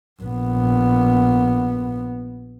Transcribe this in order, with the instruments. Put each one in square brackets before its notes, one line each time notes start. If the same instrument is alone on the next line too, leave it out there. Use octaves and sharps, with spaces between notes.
[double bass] A#1 B3